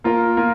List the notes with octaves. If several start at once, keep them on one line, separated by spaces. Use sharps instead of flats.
A#3 F4 A#4
A#3 F4